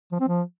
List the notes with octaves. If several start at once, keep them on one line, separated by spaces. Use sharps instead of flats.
F3
C4
F3